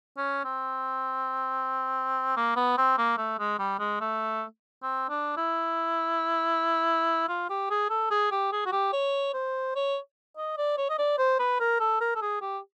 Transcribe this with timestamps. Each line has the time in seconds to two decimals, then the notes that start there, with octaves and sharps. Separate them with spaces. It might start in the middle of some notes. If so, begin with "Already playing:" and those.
0.17 C#4
0.44 C4
2.37 A#3
2.56 B3
2.78 C4
2.98 A#3
3.18 A3
3.39 G#3
3.59 G3
3.79 G#3
4.01 A3
4.83 C4
5.09 D4
5.37 E4
7.28 F4
7.50 G4
7.70 G#4
7.90 A4
8.11 G#4
8.31 G4
8.52 G#4
8.66 F#4
8.72 G4
8.93 C#5
9.34 C5
9.76 C#5
10.37 D#5
10.58 D5
10.78 C#5
10.90 D#5
10.99 D5
11.18 C5
11.39 B4
11.60 A#4
11.80 A4
12.01 A#4
12.16 A4
12.22 G#4
12.41 G4